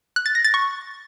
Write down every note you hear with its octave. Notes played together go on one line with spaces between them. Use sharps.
F#6
A6
A#6
A6
C#6